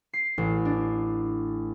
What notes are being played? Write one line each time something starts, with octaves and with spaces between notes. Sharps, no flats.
C7
A1
D4